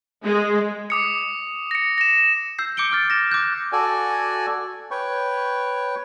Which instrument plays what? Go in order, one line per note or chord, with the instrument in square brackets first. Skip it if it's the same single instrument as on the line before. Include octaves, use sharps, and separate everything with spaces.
[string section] G#3
[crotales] D6 D#6 C#7
A#6 C#7
A#6 E7
[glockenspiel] E6 G6 C7
D6 G6 C#7 D7 G7
D6 F6 A6
A#6 E7
D6 F#6 G6
[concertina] F#4 A4 D5 G#5
B4 C#5 G5 C#6